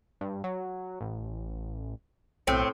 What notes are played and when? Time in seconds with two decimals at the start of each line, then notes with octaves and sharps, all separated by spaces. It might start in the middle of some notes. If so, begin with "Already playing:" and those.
0.21 G2
0.44 F#3
1.01 A1
2.47 B1 A2 C4